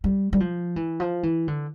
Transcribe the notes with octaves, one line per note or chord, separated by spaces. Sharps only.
G3
G3
F3
E3
F3
E3
D3